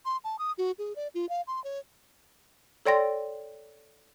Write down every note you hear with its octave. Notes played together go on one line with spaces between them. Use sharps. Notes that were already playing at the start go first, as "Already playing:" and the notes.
C6
A5
D#6
F#4
G#4
D5
F4
F5
C6
C#5
A4 C#5 D5 G5 C6 A#6